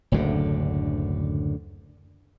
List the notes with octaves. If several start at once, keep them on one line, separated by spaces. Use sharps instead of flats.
F#1 D2 A2 D3